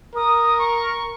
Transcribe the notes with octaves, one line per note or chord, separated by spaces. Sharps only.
A#4 D#6
C#6